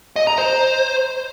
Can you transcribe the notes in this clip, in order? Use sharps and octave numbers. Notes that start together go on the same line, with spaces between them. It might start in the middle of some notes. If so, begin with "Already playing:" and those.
D#5
A#5
C5